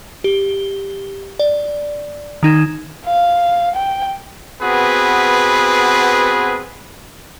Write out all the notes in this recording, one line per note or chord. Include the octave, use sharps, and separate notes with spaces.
G4 G7
D5
D#3 D#4 G#6 E7
F5
G5
B3 C4 F#4 G#4 B4